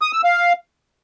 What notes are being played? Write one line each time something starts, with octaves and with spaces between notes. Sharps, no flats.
D#6
E6
F5